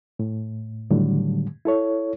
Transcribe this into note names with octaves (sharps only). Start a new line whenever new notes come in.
A2
A2 D3 D#3 F#3 G3
E4 A4 C#5